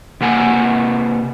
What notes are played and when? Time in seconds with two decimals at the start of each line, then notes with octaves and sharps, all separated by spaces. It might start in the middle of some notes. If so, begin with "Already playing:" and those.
0.21 C3 A#3 F#5 G#5